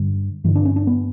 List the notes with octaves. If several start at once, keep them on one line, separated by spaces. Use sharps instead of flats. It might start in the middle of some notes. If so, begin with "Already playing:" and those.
Already playing: G2 D3
G2 D3 E3
D4
C#4
D4
B3